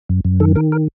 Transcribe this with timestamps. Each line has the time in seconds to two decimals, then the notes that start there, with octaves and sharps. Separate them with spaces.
0.09 F#2
0.25 F#2
0.40 D#3 A4
0.55 D#3 A#4
0.72 A#4